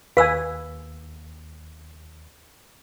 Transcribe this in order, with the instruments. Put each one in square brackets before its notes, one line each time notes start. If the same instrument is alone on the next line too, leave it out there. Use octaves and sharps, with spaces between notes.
[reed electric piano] D#2 [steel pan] B4 G#5 [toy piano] F5 E6